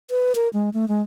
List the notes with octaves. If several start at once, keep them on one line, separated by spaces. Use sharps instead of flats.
B4
A#4
G#3
A3
G#3